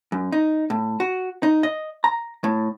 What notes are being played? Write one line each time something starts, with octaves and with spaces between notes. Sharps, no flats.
F#2
D#4
A2
F#4
D#4
D#5
A#5
A2